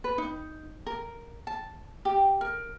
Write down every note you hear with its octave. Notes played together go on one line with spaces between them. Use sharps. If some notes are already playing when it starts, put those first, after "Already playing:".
B4
D#4
A#4
A5
G4
A#4